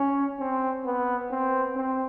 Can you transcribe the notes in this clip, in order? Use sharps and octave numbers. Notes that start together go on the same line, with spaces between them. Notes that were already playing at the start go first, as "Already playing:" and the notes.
Already playing: C#4
C4
B3
C4
C4